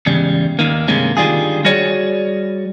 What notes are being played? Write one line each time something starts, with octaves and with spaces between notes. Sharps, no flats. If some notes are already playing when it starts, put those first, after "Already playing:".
E2 G#2 C#3 G3
D#2 D#3 A#3
G2 C3 G#3 A#3 C#4
D3 D#3 G3 F4 G#4
G3 F#4 G#4 C#5 D5